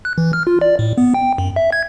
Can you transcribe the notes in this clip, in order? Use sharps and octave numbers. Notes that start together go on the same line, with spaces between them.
F#6
E3
F6
F4
D5
A2
B3
G5
F#2
E5
G#6